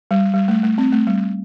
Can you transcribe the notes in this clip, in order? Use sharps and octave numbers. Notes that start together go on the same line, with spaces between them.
G3
G3
A3
A3
C4
A3
G3